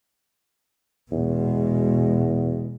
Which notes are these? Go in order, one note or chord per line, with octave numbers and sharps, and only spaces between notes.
E2 B2 G#3